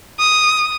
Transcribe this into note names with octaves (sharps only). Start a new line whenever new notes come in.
D#6